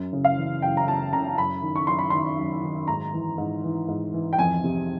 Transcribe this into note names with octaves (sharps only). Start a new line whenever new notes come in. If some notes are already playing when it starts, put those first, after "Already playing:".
Already playing: F#2
C#3
F5
E3
F#2 G5
A#5
F#2 A5
C#3 A#5
F#2 B5
D#3
C#6
F#2 C6
B5
D#3 C6
F#2
D#3
G#2 A#5
E3
G#2
E3
G#2
E3
G5
F2 G#5
C3